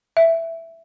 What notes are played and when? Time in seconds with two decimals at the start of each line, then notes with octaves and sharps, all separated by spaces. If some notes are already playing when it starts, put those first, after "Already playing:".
0.17 E5